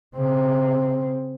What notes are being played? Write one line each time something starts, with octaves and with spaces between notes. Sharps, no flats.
C#3 C4